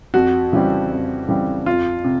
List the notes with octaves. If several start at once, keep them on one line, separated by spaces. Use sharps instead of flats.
F2 F#4
C#3 E3 G3 C4
F2
C#3 E3 G3 C4
F2 F4
C3